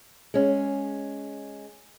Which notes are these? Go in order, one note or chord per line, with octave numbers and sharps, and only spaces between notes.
G#3 C#4